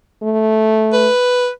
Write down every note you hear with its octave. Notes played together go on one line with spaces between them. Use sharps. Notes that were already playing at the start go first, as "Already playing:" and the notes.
A3
B4